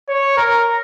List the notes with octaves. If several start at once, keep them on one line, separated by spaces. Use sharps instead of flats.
C#5
A#4